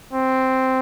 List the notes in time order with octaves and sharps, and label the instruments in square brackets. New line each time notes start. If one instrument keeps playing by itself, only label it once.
[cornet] C4